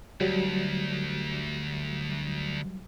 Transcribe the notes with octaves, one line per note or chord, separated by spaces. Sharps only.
D2 F#3 G3